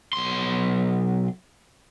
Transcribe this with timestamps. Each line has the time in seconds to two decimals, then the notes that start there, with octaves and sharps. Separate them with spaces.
0.13 B1 C6